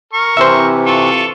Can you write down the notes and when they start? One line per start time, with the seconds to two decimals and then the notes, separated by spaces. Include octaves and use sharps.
0.13 A#4 C#6
0.37 C3 E3 C5 E5
0.86 F4 A4 C#6